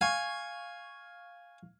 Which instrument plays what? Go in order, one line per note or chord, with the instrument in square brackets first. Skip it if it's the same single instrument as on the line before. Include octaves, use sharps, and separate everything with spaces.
[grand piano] F5 C#6 [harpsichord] G#5